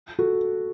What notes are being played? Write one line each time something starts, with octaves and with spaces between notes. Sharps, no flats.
F#4 A4